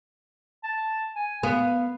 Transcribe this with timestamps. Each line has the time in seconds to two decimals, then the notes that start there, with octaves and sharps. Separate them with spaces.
0.63 A5
1.15 G#5
1.43 B3 F5